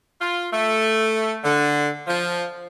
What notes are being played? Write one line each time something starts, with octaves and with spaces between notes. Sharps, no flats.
F4
A3
D3
F3